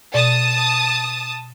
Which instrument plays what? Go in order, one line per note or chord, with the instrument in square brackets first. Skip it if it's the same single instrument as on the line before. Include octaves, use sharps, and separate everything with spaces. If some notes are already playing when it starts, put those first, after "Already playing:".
[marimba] B2 D5 [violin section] A5 D#6